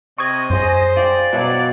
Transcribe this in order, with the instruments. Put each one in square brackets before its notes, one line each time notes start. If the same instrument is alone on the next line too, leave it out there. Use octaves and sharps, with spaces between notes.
[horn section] C3 [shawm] D#5 [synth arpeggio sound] C#6 D#6 G#6
[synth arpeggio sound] F#2 [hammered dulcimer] G#4 C#5 [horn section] C5
[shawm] D5 [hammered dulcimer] F5 G5
[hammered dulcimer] B2 F5 F#5 [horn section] F#3